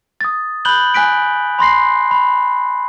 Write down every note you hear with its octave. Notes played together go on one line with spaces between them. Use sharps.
D#6 A6
B5 F#6 G6 F#7 G7
G#5 F#6 B6 D7
B5 C6 A#6 C7
B5